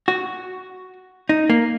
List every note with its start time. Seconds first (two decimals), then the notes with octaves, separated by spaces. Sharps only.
0.08 F#4
1.29 D#4
1.50 A#3